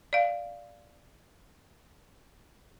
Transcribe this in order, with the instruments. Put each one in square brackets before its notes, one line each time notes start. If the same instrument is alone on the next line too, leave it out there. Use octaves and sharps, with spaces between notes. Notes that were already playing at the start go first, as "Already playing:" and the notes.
[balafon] D5 F5